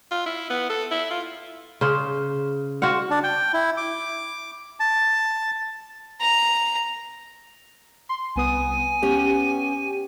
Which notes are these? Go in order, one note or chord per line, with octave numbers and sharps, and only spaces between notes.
F4
E4
B3
A4
E4
F4
C#3 C5
F#4 C5 F5 F#5
D4
G5
E4
D6
A5
A#5
C6
C2 B3 G#5 D#6
B3 C#4 G4